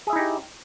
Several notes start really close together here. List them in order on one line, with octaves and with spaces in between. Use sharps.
G#4 E5 E4 D#4 G4